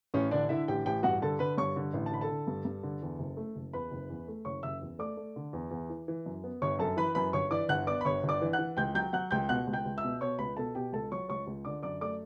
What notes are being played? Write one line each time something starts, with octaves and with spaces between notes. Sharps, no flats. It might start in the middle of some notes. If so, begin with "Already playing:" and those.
A1 C#4 C#5
D3 D4 D5
D3 E4 E5
A1 G4 G5
A1 G4 G5
G2 F#4 F#5
D3 A4 A5
D3 B4 B5
G2 C#5 C#6
D3
A1
A5
D3 B5
A4 A5
D3
G2
G2
D3
E2
F#1
A3
F#1
E2 B4 B5
F#1
E2
A3
F#1 C#5 C#6
F#1 E5 E6
E2
A3 D5 D6
A3
D3
E2
E2
E3
E3
F#2
B3
G1 C#5 C#6
F#2 A4 A5
E3 B4 B5
F#2 B4 B5
G1 C#5 C#6
E3 D5 D6
G1 F#5 F#6
B3 D5 D6
B5
G1 C#5 C#6
G1
D5 D6
E3
F#5 F#6
E3
C#2 G5 G6
F#3 G5 G6
F#3 F#5 F#6
C#2 G5 G6
B2 F#5 F#6
C#2
G5 G6
C#2
E5 E6
B2
B2 C#5 C#6
C#2 B4 B5
B2 A4 A5
B2 G4 G5
C#2 A4 A5
F#3 C#5 C#6
C#2 C#5 C#6
C#2
D3 D5 D6
F#2 D5 D6
A3 D5 D6